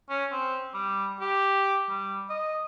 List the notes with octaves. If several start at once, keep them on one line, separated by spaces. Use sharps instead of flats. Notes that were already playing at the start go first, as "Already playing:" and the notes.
C#4
C4
G3
G4
G3
D#5